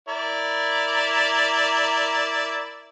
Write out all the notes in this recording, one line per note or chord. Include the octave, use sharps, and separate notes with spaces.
E4 A#4 D5